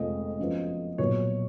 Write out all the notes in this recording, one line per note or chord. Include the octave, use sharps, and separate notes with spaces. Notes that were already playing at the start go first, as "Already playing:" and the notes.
Already playing: F1 F2 F3 G#3 D#5
F#2 F3 B3
B1 A#2 F#3 B3 C#5